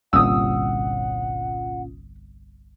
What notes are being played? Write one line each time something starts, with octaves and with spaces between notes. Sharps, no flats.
G1 C2 A#2 C#4 F4 F#5 D#6 E6